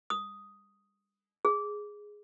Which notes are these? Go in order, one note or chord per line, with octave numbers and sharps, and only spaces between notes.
D#6
G#4